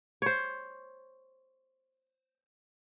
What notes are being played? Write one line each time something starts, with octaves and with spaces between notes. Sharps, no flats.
C5 C#5